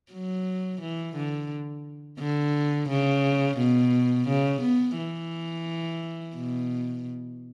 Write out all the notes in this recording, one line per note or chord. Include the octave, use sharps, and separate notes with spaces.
F#3
E3
D3
D3
C#3
B2
C#3
B3
E3
B2